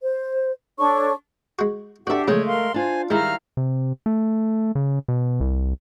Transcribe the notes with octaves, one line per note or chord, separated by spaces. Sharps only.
C5
D4 A4 C#5 C#6
G#3 F#4
D4 F#4 G4 A4 D5 E5 F#5
A#2 C#3 F3 G#3 A3 C#5
A#4 F5 C6
D4 F4 C5 G#5
D#3 G3 G#3 E4 F5 A#5 F6
C3
A3
C#3
B2
C2